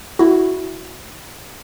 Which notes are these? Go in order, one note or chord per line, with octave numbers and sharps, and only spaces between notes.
E4 F#4